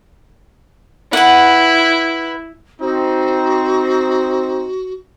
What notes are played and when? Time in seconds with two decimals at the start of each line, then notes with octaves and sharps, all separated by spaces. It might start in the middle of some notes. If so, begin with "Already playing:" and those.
1.13 E4 B4 F#5
2.81 C4 D#4 F#4